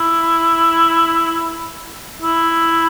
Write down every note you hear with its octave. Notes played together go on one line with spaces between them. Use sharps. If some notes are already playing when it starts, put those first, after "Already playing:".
Already playing: E4
E4